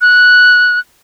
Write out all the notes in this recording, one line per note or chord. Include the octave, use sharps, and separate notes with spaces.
F#6